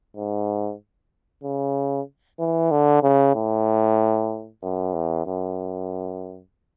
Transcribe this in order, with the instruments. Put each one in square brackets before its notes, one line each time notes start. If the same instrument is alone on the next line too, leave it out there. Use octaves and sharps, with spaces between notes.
[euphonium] G#2
C#3
E3
D3
C#3
A2
F#2
E2
F#2